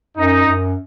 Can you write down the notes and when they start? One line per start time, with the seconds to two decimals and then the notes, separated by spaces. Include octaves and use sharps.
0.17 F#2 D#4
0.46 F#2